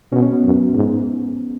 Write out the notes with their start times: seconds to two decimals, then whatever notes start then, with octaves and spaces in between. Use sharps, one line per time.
0.12 B2 C#4
0.22 C#4
0.33 B3
0.43 F#2
0.75 G#2